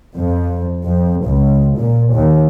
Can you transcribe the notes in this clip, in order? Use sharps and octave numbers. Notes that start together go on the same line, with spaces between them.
F2
F2
C#2
A#2
D#2